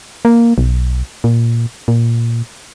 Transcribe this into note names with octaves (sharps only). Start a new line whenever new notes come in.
A#3
B1
A#2
A#2